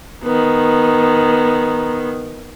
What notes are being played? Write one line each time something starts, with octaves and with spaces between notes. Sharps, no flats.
D#3 B3